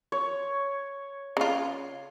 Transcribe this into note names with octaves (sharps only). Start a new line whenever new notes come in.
C#5
C#3 F4